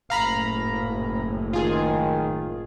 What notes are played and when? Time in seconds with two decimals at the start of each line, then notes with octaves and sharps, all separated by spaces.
0.10 F#1 A2 F5 A#5 B5
1.53 D#3 F4 G#4